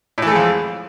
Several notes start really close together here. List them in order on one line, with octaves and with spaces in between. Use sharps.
A2 E3 A3 G#3 F2